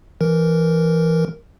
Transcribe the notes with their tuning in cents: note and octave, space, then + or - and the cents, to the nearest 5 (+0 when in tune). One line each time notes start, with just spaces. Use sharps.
E3 +10 A#4 +0